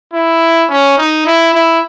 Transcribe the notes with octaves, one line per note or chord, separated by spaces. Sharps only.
E4
C#4
D#4
E4
E4